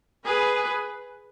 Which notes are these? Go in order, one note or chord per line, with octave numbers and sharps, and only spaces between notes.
G#4 B4